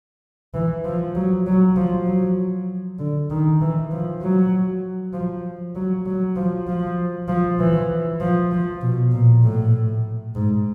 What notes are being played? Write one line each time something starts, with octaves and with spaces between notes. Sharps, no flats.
E3
F3
F#3
F#3
F3
F#3
D3
D#3
E3
F3
F#3
F3
F#3
F#3
F3
F3
F3
E3
F3
F3
B2
A#2
A2
G#2